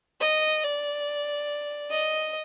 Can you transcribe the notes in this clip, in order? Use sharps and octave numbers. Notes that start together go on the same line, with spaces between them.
D#5
D5
D#5